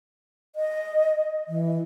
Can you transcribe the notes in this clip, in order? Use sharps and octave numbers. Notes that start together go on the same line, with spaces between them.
D#5
E3